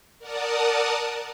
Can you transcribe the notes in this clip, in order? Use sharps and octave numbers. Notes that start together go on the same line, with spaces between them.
A#4 D5 F#5 A5 D#6